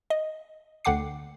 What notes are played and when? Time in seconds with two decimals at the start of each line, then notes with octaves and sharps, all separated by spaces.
0.10 D#5
0.85 D2 D3 F#5 G5 D6 C7